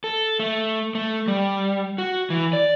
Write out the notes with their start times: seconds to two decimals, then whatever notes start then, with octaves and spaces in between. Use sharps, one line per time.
0.04 A4
0.39 A3
0.95 A3
1.28 G3
1.98 F#4
2.30 E3
2.53 D5